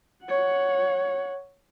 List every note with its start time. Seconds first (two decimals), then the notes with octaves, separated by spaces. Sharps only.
0.24 C#5 F#5